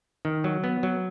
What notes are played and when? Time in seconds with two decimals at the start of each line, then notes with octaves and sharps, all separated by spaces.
0.25 D#3
0.44 F#3
0.64 B3
0.83 F#3